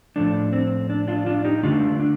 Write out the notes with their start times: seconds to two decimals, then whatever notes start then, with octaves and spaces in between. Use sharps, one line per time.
0.16 A2 F3 A3 D4
0.53 C4
0.90 D4
1.08 D4 F4
1.26 D4 F4
1.45 D#4 G4
1.63 D3 A3 D4 F4
2.00 D4